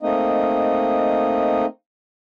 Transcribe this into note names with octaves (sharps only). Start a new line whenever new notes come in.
A3 A#3 C4 D#4 D#5